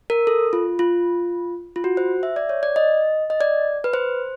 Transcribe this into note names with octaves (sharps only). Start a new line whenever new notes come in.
A#4
A4
F4
F4
F4
F#4
C5
E5
D5
C#5
D5
D#5
D#5
D5
B4
C5